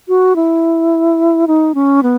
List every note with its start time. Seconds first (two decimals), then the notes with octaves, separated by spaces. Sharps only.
0.08 F#4
0.36 E4
1.47 D#4
1.75 C#4
2.03 B3